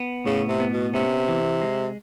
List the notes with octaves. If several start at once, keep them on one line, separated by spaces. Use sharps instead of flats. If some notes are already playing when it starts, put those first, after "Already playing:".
Already playing: B3
A2 C#3
C3
B3
B2
C3 C#4
E3
G#3